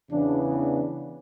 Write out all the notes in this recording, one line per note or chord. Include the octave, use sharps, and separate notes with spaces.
E2 C#3 E3 B3 D4
D4